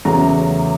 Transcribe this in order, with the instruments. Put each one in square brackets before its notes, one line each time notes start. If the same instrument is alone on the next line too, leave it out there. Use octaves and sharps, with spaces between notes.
[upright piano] E2 C#3 F#3 A3 C#4 A#5